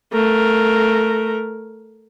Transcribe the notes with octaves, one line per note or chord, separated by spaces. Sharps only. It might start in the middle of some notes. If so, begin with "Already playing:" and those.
A3 A#4